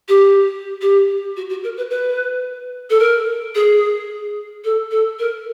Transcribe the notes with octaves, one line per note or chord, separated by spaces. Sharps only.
G4
G4
F#4
F#4
A#4
B4
B4
A4
A#4
G#4
A4
A4
A#4